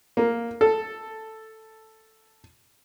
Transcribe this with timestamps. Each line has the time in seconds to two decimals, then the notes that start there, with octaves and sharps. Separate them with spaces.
0.17 A#3
0.61 A4